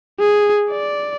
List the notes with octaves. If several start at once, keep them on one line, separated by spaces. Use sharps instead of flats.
G#4
D5